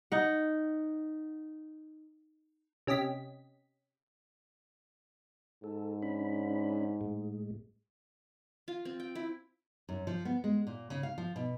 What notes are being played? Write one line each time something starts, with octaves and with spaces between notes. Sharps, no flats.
D#4 F#5
C3 C#4 G4 D#5 B6
G#2 A4
C#4 D4 B5
A2 G#3
F4
C4
G5
E4
F#2
F3
B3
G#3
A#2
C#3
F5
F3
B2